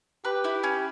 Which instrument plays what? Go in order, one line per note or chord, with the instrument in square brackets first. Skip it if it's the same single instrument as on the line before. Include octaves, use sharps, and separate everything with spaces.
[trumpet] G4 [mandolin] B4
[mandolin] E4
C#4